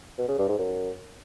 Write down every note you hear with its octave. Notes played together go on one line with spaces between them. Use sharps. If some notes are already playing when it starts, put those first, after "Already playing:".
B2
C#3
G2
G#2
F#2